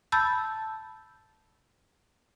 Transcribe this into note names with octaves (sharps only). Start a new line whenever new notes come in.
A5 B5 E6 G6 A6